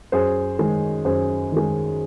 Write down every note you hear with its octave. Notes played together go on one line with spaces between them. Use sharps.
F#2 G#4 C5
D#3 G#3
F#2 G#4 C5
D#3 G#3